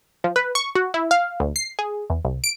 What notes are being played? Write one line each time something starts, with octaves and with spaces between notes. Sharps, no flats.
F3
B4
C#6
F#4
E4
F5
D2
C7
G#4
E2
C2
D7